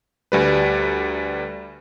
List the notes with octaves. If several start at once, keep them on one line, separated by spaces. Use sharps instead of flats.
D2 G3 B4